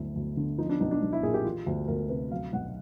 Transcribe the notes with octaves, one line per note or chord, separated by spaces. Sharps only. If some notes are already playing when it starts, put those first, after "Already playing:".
Already playing: D2 F#3 E4
D2
D3
F3 D#4
D4
B1 D#4
D4
B1
E4
A#2 G#4
G4
E3 F4
D2 F#4
D2 A#4
C3 B4
F#3 F5
B1 F#5